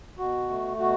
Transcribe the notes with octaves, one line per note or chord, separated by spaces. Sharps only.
B2 F#4
A3
B2 F#4